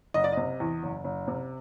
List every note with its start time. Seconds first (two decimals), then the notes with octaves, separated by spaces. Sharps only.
0.14 F#1 D#5
0.24 D5
0.32 C3 D#5
0.60 E2
0.83 F#1
1.04 F#1
1.28 C3